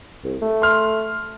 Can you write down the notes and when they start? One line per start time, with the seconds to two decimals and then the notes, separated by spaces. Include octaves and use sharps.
0.24 C2
0.42 A3
0.62 C6 F6